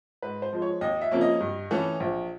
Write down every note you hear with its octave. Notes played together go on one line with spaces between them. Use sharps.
G#2 B4
C5
F3 G#3
C#5
D#2 D#5
E5
C#3 F3 A#3 C#4
D#5
G2
E3 A3 C#4
A#1